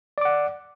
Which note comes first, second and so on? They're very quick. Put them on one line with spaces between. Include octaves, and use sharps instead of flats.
D5 D6 F#5